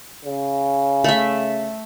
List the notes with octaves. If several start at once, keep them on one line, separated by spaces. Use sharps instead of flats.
C#3
A3 E5